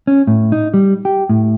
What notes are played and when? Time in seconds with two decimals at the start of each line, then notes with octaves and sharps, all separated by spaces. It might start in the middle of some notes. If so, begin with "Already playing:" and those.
0.07 C#4
0.27 A2
0.52 D#4
0.74 G3
1.05 G4
1.29 A2